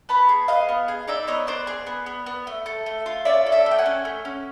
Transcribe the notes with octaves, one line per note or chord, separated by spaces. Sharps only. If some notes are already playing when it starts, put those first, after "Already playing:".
B3 A5 B5
G#4
B3 D#5 F5
B3
G#4
D#4 D5 E5
B3 C#5 D#5
B3 C5 D5
G#4
B3
B3
B3
A3
A4
A3
F4
C#4 D5 E5
A4
D5 E5
A3
G5
F#5 G#5
C#4
A3
C#4